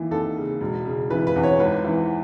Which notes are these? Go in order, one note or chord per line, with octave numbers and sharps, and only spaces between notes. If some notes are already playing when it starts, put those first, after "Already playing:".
Already playing: D#2 E3
D#2 A4
C#3
E1
C#3
E3 B4
B4
E2
C#5
G#1 B4
E3